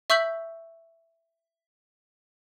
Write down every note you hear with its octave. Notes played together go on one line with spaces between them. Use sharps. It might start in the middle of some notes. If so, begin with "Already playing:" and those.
E5 C#6 E6 G6 B6 F#7